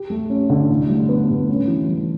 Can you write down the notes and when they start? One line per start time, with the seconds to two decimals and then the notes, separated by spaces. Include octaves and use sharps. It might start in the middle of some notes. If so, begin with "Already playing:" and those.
Already playing: G4
0.10 A3
0.30 C#4
0.50 D3
0.70 A2
0.89 G3
1.09 B3
1.29 A2
1.49 C#4
1.68 E3
1.88 G3